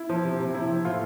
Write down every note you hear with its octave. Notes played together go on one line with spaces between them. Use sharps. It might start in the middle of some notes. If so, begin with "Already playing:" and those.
Already playing: E4
F3
C3
C3
F3 E4
F3
A2 F4